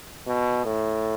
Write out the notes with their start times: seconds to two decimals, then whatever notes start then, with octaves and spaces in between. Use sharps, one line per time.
0.27 B2
0.65 A2